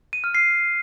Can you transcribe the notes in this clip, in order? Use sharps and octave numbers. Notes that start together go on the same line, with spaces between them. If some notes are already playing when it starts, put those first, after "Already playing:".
D#7
F6
C7